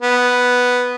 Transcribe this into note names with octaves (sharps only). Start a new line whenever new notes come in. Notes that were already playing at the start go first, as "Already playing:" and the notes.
B3